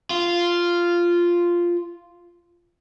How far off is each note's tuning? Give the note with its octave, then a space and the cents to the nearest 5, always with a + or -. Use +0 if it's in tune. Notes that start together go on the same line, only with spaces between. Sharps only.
F4 -5